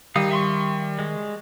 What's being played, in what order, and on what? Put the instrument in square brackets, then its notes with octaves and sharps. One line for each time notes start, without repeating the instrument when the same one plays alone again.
[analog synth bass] D#3 [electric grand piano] G3 [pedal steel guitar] D#4 F5 D#6
[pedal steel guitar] E5 C6 C#6
G#3